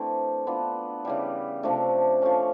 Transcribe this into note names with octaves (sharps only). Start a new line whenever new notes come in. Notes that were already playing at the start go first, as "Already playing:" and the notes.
Already playing: E3 A3 C4 D4
B3 D4 F4
C#3 E3 G3
C3 F3 A3 D4
F3 A3 C#4